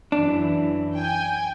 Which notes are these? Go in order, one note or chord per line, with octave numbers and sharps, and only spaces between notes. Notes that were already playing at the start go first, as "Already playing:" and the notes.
F#2 E3 D4
G5 G#5